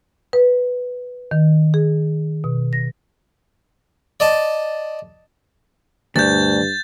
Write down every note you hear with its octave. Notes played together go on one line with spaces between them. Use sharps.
B4
D#3
G#4
B2
A#6
D5 D#5 A5
D2 G2 G6 A6